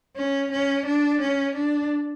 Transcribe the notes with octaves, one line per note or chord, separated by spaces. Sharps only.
C#4
C#4
D4
C#4
D4